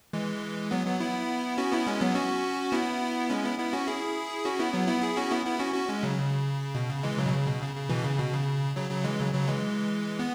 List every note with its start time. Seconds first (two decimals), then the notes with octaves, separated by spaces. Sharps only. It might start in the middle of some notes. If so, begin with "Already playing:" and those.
0.13 E3 G#3
0.71 F#3 B3
0.86 F#3 B3
1.00 B3 E4
1.58 C#4 F#4
1.72 B3 E4
1.87 G#3 C#4
2.00 F#3 B3
2.15 C#4 F#4
2.72 B3 E4
3.30 G#3 C#4
3.44 B3 E4
3.59 B3 E4
3.73 C#4 F#4
3.88 E4 G#4
4.45 C#4 F#4
4.59 B3 E4
4.74 F#3 B3
4.88 B3 E4
5.02 E4 G#4
5.17 C#4 F#4
5.31 B3 E4
5.46 B3 E4
5.59 C#4 F#4
5.74 C#4 F#4
5.88 G#3 C#4
6.03 C#3 F#3
6.18 C#3
6.75 B2
6.90 C#3
7.03 E3 G#3
7.18 C#3 F#3
7.26 B2
7.33 C#3
7.46 B2
7.62 C#3
7.75 C#3
7.89 B2 E3
8.04 C#3
8.19 B2
8.33 C#3
8.76 C#3 F#3
8.90 C#3 F#3
9.04 E3 G#3
9.19 C#3 F#3
9.34 C#3 F#3
9.48 E3 G#3
10.19 B3